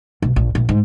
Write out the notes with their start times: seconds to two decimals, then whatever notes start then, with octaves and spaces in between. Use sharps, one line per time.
0.22 B1
0.36 A#1
0.55 A#1
0.69 G#2